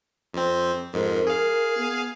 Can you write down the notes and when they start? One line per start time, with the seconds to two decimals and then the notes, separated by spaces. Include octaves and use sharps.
0.34 F2 C4
0.93 F2 G#2 A#4
1.27 G#4 F5
1.78 B3